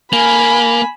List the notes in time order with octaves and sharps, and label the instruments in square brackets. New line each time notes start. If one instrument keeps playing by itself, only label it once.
[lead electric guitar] A#3 [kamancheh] G#5 B5